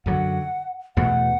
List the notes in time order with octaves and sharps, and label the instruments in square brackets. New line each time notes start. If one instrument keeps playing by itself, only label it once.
[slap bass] F#2 D3 F#3 [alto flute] F#5
[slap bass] E2 B2 A3 [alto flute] F#5